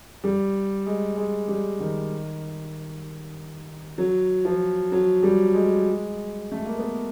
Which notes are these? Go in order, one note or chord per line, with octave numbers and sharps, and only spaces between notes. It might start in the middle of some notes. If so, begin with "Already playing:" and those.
G3
G#3
G#3
G3
D#3
F#3
F3
F#3
G3
G#3
A3
A#3
B3